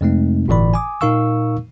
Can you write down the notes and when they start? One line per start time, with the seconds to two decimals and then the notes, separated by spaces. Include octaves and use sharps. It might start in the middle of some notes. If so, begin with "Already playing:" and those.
0.01 F2 C3 G#3 A3 C4 D#4
0.48 G1 A2 E3 D5 B5
0.74 G#5 D6 D#6
1.01 A#2 D#4 A#4 F5 C#6 E6